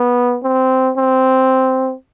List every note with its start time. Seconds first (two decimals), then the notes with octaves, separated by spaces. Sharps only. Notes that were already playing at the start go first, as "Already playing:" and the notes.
Already playing: B3
0.43 C4
0.97 C4